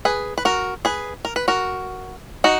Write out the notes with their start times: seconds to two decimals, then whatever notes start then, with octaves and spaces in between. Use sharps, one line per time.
0.05 G#4 B4
0.38 B4
0.45 F#4 A#4
0.85 G#4 B4
1.25 A#4
1.36 B4
1.48 F#4 A#4
2.44 D#4 F#4